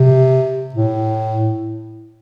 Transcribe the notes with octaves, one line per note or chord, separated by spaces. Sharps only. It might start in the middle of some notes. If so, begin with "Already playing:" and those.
Already playing: C3
A2